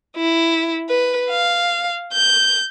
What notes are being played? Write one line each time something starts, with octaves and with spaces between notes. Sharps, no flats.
E4
B4
F5
G6